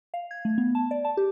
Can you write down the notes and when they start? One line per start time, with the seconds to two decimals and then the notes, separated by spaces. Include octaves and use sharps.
0.14 F5
0.31 G#6
0.45 A3
0.58 B3
0.75 A5
0.91 D5
1.05 A5
1.17 G4